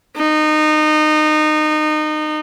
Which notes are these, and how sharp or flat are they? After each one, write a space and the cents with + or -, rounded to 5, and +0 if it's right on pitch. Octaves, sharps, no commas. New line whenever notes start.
D#4 -25